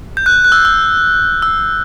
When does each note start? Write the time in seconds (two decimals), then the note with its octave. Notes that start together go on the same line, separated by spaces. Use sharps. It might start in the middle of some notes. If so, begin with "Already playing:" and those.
0.17 G6
0.26 F#6
0.44 F#6
0.52 E6
0.65 E6
1.42 E6